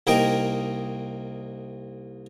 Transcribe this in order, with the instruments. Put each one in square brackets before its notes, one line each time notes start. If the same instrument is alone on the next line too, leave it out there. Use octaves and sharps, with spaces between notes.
[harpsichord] C2 A#3 D#4 A#4 G5